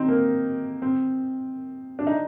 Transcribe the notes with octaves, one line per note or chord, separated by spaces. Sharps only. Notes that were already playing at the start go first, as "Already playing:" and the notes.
Already playing: C4 D#4
A#3
C4
D4
D#4